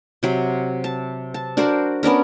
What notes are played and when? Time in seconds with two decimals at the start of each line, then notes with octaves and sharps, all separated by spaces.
0.23 C3 F#3
0.84 A5
1.34 A5
1.57 D4 F#4 A#4 C5
2.03 B3 C#4 D4 A#4